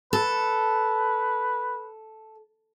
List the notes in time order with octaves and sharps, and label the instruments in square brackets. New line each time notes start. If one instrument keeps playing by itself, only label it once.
[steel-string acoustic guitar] A4 [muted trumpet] B4